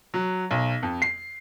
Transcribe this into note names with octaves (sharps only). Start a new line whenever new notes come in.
F#3
B1
F2
C7